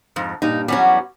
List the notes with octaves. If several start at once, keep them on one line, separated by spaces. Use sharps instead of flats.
F2 G#2
G2 A#2 D#4
E2 F#3 G3 C#4 F#4